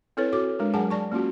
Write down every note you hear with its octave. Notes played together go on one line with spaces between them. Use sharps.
C4 E4 A4 B4 C#5
F#4 A4 D6
G#3 D4 A#4
F#3 G#4 F#5 G#5 A5
D5 A5 C#6
A#3 C#4 F4 F#4